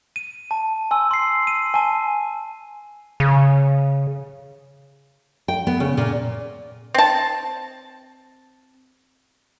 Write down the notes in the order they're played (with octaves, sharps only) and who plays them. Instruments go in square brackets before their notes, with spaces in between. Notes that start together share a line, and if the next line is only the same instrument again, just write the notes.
[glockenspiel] D#7
A5
G#5 C6 E6
C6 C7
D#7
G#5 A5
[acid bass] C#3
[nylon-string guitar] G5
B3
C#3
A#2
[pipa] C4 A5